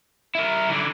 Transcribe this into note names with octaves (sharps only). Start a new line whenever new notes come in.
E4 A#4
D3 E3